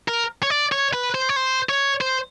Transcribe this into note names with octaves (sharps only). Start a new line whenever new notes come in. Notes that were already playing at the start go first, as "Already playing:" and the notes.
A#4
C#5
D5
C#5
B4
C5
C#5
C5
C#5
C5